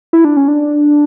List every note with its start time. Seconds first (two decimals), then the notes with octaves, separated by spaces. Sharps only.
0.13 E4
0.25 D4
0.37 C#4
0.48 D4